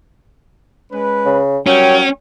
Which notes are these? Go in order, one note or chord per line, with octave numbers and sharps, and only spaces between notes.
G#3 C#4 B4
C#3
F#3 G3 C#4 A#4 G5